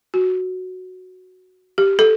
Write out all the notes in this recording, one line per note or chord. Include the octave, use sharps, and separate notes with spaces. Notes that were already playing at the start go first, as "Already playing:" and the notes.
F#4
G4
A4